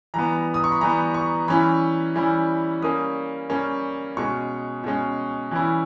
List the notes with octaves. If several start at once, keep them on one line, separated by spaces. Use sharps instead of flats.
E3 G3 B3 A#5
D#6
C#6
B5
E3 G3 B3 A#5
C#6
E3 G3 C#4 E4 B5
E3 G3 C#4 E4
G3 A#3 C#4 D#6
G3 A#3 C#4
B2 G#3 C#4 C#6
B2 G#3 C#4
E3 G3 C#4 E4